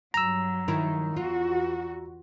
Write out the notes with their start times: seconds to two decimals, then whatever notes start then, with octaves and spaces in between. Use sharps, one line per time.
0.14 G2 F#3 A#5 E6
0.68 D#3 E4 A#4
1.16 E2 F4 F#4